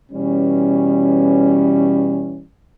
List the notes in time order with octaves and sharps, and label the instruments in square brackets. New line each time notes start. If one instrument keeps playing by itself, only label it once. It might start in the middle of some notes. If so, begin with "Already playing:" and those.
[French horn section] B2 E3 G3 C#4